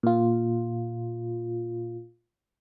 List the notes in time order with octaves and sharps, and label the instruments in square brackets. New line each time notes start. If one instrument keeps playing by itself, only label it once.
[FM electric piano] A#2 F4